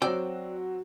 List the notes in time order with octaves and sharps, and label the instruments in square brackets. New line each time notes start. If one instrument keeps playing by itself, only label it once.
[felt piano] F#3 C4 E6 [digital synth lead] F#4 [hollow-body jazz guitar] D5 G5